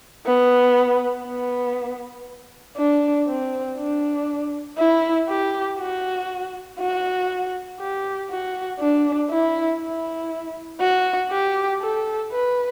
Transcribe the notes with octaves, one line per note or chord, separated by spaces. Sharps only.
B3
B3
D4
C4
D4
E4
G4
F#4
F#4
G4
F#4
D4
E4
E4
F#4
G4
A4
B4